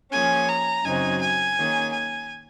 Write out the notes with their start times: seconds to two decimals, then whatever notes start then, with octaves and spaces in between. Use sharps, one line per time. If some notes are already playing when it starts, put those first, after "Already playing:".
0.12 F3 A#3 C#4 G#4 G#5
0.49 A#5
0.85 F#2 C#3 F#3 C4 D#4 G#5
1.21 G#5
1.57 D#3 A#3 C#4 G#4
1.93 G#5